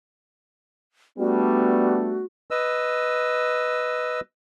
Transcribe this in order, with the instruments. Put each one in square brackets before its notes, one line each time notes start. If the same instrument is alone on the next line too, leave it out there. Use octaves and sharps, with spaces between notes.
[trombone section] G3 A3 D4 [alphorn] B3 [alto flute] F#4
[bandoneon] B4 D#5 E6